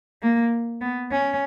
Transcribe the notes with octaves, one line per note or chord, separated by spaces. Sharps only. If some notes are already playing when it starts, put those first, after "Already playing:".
A#3
B3
C#4